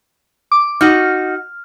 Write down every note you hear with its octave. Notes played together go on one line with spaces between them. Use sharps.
D6
D#4 F#4 F6